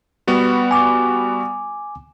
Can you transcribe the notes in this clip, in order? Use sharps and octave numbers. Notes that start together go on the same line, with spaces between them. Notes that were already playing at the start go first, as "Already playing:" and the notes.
G3 B3 F#4
G#5 D6